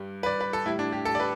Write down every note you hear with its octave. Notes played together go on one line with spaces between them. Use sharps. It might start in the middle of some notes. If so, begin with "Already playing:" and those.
Already playing: G2 G3
B4
D5
B4
A4
A2 G3 E4
D4
G4
A4
D5
B4